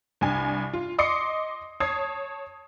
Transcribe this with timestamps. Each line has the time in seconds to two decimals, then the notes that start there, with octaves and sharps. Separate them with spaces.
0.21 C2 G2 G#5
0.73 F4
0.98 D#5 C6 D6 D#6 C7 C#7
1.80 C#5 A5 D#6 G#6 C7